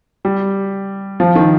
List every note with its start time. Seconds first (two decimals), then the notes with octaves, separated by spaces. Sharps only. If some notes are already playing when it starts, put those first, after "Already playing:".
0.25 G3
1.20 F3
1.35 D#3